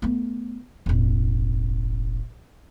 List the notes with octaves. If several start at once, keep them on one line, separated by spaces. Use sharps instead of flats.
A3 B3
E1 A1